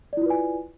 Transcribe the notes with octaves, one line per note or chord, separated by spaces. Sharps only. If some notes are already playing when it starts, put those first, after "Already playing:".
E4 F4 B4 D5 G#5